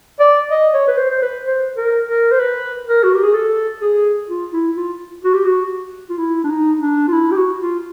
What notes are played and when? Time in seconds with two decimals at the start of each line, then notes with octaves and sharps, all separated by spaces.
0.20 D5
0.51 D#5
0.74 C#5
0.87 B4
0.98 C5
1.10 C5
1.22 B4
1.46 C5
1.77 A#4
2.09 A#4
2.32 C5
2.40 B4
2.88 A#4
3.04 F#4
3.14 G4
3.24 G#4
3.34 A4
3.81 G#4
4.29 F4
4.53 E4
4.76 F4
5.24 F#4
5.34 G4
5.45 F#4
6.10 F4
6.18 E4
6.44 D4
6.50 D#4
6.81 D4
7.08 F4
7.13 E4
7.31 G4
7.36 F#4
7.60 F4